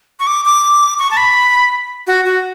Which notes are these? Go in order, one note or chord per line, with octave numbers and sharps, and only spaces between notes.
C#6
D6
D6
C#6
A5
B5
F#4
F#4